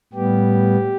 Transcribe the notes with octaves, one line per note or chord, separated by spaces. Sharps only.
A2 G3 B3 G4